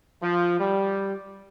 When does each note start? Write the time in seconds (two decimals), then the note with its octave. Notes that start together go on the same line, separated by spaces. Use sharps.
0.21 F3
0.59 G3